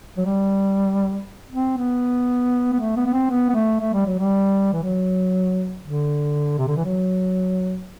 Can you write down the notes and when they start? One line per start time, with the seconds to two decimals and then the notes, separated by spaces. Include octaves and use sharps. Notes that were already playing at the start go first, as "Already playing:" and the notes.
0.17 F#3
0.26 G3
1.52 C4
1.77 B3
2.73 B3
2.80 A3
2.96 B3
3.07 B3
3.13 C4
3.30 B3
3.50 B3
3.55 A3
3.81 A3
3.94 G3
4.06 F#3
4.19 G3
4.73 E3
4.83 F#3
5.84 D3
6.58 C3
6.68 D3
6.77 E3
6.85 F#3